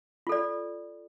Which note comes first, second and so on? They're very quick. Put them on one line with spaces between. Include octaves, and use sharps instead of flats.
F4 A4 D5